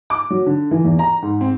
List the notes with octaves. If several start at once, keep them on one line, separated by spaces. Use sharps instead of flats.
D6
F#3
D3
E3
E2
A#5
G#2
C4